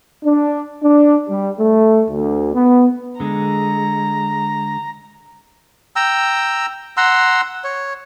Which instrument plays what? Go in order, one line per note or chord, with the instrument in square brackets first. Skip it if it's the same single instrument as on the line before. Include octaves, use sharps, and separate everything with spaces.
[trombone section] D4
D4
G3
A3
D2
B3
[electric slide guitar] D3 G#3 [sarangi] A#5
[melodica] G5 A#5 E6
F#5 A#5 C6 E6
C#5